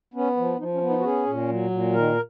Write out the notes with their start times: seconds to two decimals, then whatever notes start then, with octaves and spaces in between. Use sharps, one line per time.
0.14 B3 C#4
0.37 F3
0.59 F3 D#4
0.74 C#4
0.81 B3
0.89 D#4
0.99 F#4
1.04 C#4 G#4
1.27 A#2
1.48 F#3
1.70 A#2
1.93 D#3 A#4